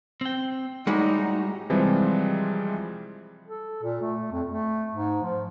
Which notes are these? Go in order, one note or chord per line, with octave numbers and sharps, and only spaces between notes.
C4 G5
A2 G3 G#3 D#4 F#4
C3 E3 F3 G3 G#3 C4
A4
A#2
A3
F2
A3
G#2
F3